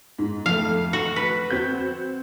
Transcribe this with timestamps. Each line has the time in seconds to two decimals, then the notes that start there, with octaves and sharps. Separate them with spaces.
0.19 G#2
0.46 F2 A3 F5
0.93 F#4
1.16 B4
1.50 C4 F#4 G6